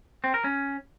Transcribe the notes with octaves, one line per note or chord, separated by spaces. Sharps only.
C4
A#4
C#4